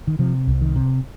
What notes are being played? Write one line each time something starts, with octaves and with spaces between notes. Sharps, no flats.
D#3
C3 F3
C2
D#3
C3